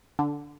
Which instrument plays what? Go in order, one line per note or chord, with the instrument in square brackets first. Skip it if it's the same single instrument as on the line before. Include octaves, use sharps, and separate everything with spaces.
[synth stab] D3